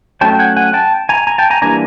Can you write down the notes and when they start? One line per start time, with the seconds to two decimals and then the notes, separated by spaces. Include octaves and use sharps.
0.21 F#3 A3 C#4 G5 A5
0.39 F#5 G#5
0.56 F#5 G#5
0.73 G5 A5
1.09 G#5 A#5
1.27 G#5 A#5
1.38 G5 A5
1.50 G#5 A#5
1.62 E3 G3 A#3 D4 G#5 A#5